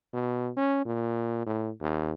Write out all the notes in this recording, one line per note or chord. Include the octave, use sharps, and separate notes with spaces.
B2
C#4
A#2
A2
D#2